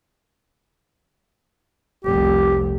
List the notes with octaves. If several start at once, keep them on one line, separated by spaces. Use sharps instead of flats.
F1 C2 G4